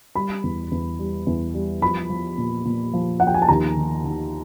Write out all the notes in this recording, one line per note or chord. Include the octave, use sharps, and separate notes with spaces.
G3 B5
E2
E2
G3
E2
G3
F3 B5
F3
A#2
A#2
F3
F3 F#5
G5
G#5
A5
D#2 A#5
D#3
D#3